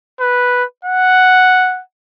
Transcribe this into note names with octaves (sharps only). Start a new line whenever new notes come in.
B4
F#5